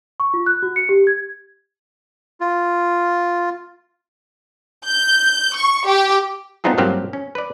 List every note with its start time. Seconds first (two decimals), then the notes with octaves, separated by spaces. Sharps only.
0.20 C#6
0.34 F4
0.46 F#6
0.63 F#4
0.76 C#7
0.89 G4
1.07 G#6
2.41 F4
4.86 G6
5.55 C#6
5.86 G4
6.64 B3 C4 D4 D#4 F4 G#4
6.78 G2 F#3 A#3 C4 F4 G4
7.13 C#4
7.35 B4 D5